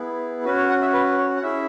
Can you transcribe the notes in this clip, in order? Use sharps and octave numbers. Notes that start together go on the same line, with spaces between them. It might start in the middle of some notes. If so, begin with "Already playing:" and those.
Already playing: B3 E4 G#4
C#4 F#4 B4
C#5
F#5
E5
B4
C#5
F#5
C#4 E4 G#4 E5